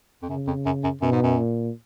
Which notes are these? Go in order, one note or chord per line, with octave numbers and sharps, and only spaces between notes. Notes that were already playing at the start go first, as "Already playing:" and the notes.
F2
F#2 C#3
F2
F#2
F#2
F#2 B2
G#2
F#2
A#2